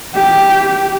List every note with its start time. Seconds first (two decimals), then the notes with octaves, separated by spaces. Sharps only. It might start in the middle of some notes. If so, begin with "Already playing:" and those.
0.15 G4